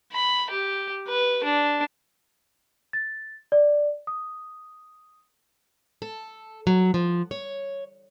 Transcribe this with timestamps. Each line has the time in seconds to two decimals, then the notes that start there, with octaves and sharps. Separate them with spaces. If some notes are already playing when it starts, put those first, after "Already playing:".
0.13 B5
0.50 G4
1.08 B4
1.44 D4
2.93 A6
3.52 D5
4.07 D#6
6.02 A4
6.67 F#3
6.94 F3
7.31 C#5